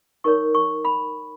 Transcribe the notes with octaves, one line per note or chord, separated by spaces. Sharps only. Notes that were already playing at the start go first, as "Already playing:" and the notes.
D#4 A#4 C#5 C#6
C#6
B5